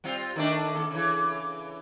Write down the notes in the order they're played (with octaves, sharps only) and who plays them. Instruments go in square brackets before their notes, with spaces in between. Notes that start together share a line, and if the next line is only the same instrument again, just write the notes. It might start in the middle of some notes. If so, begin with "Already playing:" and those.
[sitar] G3 C4 F4
D#3 A3 D4
D#2 A4
C#3 E3